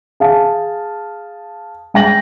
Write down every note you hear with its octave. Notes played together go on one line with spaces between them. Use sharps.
G#4 F5 A5
G#3 G5 A#6 F#7